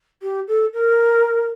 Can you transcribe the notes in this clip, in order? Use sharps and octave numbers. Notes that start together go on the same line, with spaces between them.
G4
A4
A#4